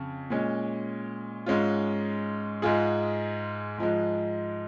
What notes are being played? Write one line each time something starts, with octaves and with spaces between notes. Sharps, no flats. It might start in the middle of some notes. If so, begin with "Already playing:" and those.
Already playing: F2 C#3
A#2 G#3 C#4
G#2 G#3 C#4 F4
G#2 G#3 F4 G#4
G#2 F3 G#3